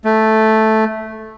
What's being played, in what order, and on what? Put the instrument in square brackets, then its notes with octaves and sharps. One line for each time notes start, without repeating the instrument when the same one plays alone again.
[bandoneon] A3